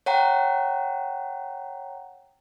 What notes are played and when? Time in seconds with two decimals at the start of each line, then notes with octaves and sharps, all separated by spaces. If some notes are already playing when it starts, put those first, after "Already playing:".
0.06 C#5 F#5 G5 A#5